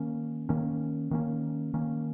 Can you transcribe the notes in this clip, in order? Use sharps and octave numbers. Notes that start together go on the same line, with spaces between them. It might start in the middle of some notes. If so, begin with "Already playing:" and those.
Already playing: D#3 A#3 C#4
D#3 A#3 C#4
D#3 A#3 C#4
D#3 A#3 C#4